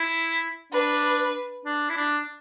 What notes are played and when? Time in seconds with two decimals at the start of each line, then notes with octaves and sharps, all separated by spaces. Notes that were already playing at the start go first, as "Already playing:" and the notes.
Already playing: E4
0.73 D4 B4
1.65 D4
1.90 E4
1.97 D4